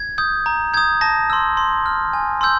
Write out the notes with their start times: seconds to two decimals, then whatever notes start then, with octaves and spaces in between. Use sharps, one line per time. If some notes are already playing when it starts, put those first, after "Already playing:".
Already playing: G#6
0.18 D#6 G6
0.46 A#5
0.74 D#6 G6 G#6
1.01 A5 A#6
1.30 C6 E6
1.57 C6
1.86 F6
2.13 G#5
2.41 C6 E6 G6